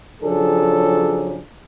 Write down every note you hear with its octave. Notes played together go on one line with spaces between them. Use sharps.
C#3 F3 F#3 D4 G#4 A4